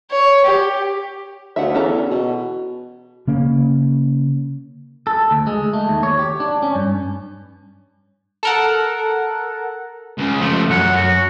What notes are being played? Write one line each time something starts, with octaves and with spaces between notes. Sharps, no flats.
C#5
G4
D2 E5 F#5
E2 C#4 A4 A#5
B2
C#3 A#3 C#4
A4
D2
G#3
A3
D#2
C#5
G4
D4
C#4
G2
A4 A#4 F#5
C#2 C#3
F3 A3
F#2 F#5
F#4